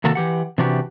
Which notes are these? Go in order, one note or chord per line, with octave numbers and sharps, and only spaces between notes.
C3 D#3 A#3 F#4 A4
E3 G4 F#5
C3 E3 D4 F#4 G4